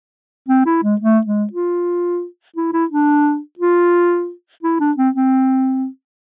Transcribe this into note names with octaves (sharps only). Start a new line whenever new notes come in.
C4
E4
G#3
A3
G#3
F4
E4
E4
D4
F4
E4
D4
C4
C4